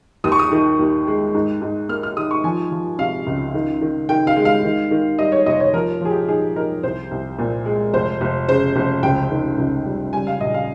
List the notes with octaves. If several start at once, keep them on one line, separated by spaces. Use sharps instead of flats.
D#2 D#6
C#6
D#6
D#3
D#2
G#3
G#2
G#2
A#3 F6
F6
D#3 D#6
C#6
F3 G#5
F3
C3 F5
C#2
D#3
D#3
D#3 G5
F5
G#3
F5
D#3
D#3
G3 D#5
C#5
F1 D#5
C#5
F3 A#4
F3 G#4
G4
D#4 G#4
D#4 A#4
C2 C5
C2
A#2
G#3
F1 C5
F1
C#3 C5
F1
C#2 G5
D#3
C#2
G3
G3 G#5
F5
A#1 D#5
F5